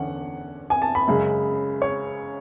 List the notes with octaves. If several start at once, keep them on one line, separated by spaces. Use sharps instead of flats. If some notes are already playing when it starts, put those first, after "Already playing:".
Already playing: E2 D3 C#4 F#5
G#5
A5
B5
F#2 C#3 G#3
C#5